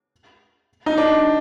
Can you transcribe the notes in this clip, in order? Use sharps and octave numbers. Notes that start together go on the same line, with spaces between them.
D#4
D4